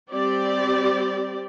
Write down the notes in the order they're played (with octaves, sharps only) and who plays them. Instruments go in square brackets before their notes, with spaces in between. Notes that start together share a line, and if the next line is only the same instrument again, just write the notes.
[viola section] G3 C4 G4 D5